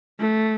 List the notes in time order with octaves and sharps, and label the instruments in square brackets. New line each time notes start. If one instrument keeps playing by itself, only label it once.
[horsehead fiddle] A3